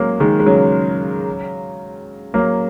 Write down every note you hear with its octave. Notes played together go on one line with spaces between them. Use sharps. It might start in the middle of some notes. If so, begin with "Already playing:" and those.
Already playing: F#3 G#3 A#3 C#4
D#3 G#3
G#3
C#3 F#3
F#3 A#3